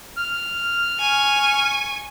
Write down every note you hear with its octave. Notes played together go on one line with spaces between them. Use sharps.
F6
G#5 C#6